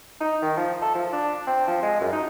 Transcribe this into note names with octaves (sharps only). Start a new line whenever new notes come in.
D#4
D#3
F3
A4
F3
D4
C4
F3
G#3
F#2
D#4